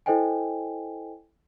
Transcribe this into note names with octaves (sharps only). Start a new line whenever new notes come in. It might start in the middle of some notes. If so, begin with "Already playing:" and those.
E4 A4 C5 D#5 G5 G#5